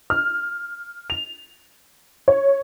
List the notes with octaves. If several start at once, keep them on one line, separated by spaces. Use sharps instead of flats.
F6
F7
C#5